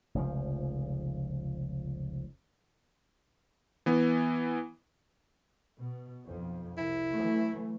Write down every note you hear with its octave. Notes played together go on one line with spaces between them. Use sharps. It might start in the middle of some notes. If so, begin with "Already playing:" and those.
F1 C#2 F3
E3 B3
B2
B1 F2
C2 E4
E3 F#3 A3